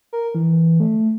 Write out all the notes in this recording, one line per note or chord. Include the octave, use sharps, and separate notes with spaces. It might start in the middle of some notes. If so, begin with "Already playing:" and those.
A#4
E3
A3